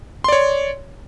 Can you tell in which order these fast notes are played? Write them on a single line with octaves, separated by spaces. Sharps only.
C6 D5 C#5